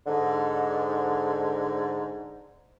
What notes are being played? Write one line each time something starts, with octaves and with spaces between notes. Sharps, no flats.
G#2 D3